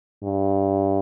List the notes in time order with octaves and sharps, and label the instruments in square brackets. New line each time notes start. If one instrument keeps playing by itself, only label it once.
[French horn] G2